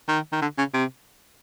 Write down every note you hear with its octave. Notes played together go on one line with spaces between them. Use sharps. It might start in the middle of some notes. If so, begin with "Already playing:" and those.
D#3
D#3
D3
C#3
C3